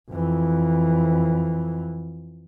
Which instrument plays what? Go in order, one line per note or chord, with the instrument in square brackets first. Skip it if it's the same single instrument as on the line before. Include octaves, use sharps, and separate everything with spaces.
[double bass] F2 E3